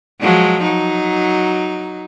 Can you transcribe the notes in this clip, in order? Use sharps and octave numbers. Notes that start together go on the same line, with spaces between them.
F3 F#3 G#3
F#3 D#4